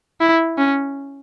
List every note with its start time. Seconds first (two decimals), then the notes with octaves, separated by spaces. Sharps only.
0.21 E4
0.58 C#4